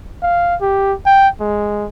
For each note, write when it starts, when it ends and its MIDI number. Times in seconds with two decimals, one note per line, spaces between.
0.22 0.56 77
0.62 0.93 67
1.06 1.28 79
1.40 1.87 56